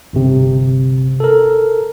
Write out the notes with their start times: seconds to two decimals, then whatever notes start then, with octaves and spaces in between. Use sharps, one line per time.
0.13 G1 C3
1.20 A4 A#4